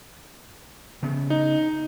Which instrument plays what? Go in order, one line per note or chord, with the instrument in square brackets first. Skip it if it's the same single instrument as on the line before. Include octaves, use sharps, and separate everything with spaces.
[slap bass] C#3 B3
[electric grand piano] D#4